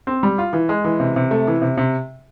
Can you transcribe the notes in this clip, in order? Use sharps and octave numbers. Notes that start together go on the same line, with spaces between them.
C4
G3
F4
E3
G#3
E3
C3
C3
A3
E3
C3
C3